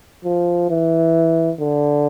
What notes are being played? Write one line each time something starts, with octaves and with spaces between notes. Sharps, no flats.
F3
E3
D3